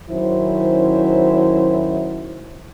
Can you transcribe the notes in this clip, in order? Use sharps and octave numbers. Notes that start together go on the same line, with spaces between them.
D#3 F#3 C#4 E4 C5